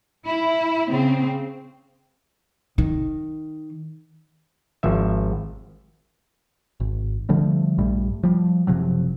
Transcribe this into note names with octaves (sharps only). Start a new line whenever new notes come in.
E4
C#3 C4
D#3
G#1 F3 E5
G#1
D3 F3 G3 A3
A#1 G2 G3 A3
F3 G3
F#1 C3 F3 F#3